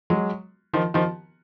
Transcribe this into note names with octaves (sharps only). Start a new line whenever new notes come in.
F#3 G#3
D#3 F3
D#3 F3